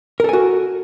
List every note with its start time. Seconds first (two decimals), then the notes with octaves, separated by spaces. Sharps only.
0.20 A#4
0.24 A4
0.29 G#5
0.33 F#4